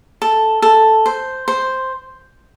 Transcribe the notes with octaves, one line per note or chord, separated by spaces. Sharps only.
A4
A4
C5
C5